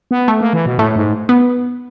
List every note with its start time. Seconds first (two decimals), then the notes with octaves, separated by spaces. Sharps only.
0.11 B3
0.28 A3
0.41 A#3
0.53 E3
0.66 B2
0.78 A2 A3
0.95 G#2
1.29 B3